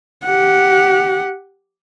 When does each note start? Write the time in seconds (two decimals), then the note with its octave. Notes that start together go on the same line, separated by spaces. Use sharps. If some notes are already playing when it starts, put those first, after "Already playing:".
0.24 G4 F#5